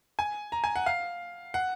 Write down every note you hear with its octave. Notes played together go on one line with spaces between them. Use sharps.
G#5
A#5
G#5
F#5
F5
F#5